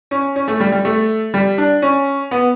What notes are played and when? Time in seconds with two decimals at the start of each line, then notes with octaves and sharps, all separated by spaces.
0.11 C#4
0.36 C#4
0.48 A3
0.60 G3
0.72 G3
0.85 A3
1.34 G3
1.58 D4
1.82 C#4
2.31 B3